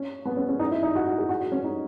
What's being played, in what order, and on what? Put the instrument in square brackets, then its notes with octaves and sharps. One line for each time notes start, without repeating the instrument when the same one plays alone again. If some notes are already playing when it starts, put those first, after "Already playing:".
Already playing: [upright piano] C#4
B3
C#4
C#4
D#4
E4
D#4
F#4
F#4
G#4
F#4
F#4
C#4
D#4